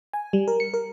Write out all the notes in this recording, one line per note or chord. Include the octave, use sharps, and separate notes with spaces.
G#5
G3
A#4
C#7
A#4